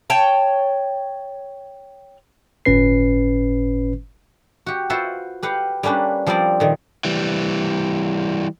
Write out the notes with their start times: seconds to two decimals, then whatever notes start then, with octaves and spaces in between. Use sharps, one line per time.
0.10 C#5 G5 A5
2.65 G1 A2 C#4 B4 C7
4.66 F#4 G4
4.90 F4 F#4 B4 C5 E5
5.43 G4 B4 F5 F#5
5.83 G3 A#3 C#4 D4 B4
6.27 F3 G3 C4 A#4 D5
6.60 A#2 D#3
7.05 E3 G3